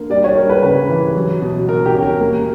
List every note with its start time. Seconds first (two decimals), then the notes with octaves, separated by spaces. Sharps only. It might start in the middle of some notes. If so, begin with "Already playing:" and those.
Already playing: D3 A#3
0.10 G3 D5
0.24 C#5
0.36 G3 A#4
0.50 B4
0.63 C#3 B4
0.89 E3
1.16 F#3
1.41 B2
1.67 B2 A#4
1.86 G4
1.94 C#4
2.03 A#4
2.20 A#3